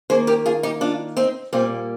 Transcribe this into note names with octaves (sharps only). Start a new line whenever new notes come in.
D#3 A#3 G#4 C5
G4 A#4
F4 G#4
D#4 G4
D4 F4
C4 D#4
A#2 G3 A#3 C4